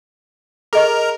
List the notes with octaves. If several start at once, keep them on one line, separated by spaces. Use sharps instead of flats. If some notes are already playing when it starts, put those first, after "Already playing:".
G#4 A#4 D#5 C#6